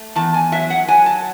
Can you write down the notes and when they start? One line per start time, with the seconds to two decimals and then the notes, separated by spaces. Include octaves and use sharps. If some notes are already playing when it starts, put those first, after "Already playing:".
Already playing: A3
0.15 E2 A5
0.34 G#5
0.52 F#3 E5
0.70 F#5
0.88 F#3 G#5
1.06 A5